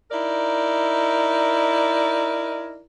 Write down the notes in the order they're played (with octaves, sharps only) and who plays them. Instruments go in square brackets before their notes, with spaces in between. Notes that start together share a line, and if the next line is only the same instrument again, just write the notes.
[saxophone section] D#4 E4 A#4 D5